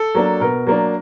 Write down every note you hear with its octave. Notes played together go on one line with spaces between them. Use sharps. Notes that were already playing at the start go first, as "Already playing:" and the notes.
Already playing: A4
F#3 A#3 D4
B2 A#4
F#3 A#3 D4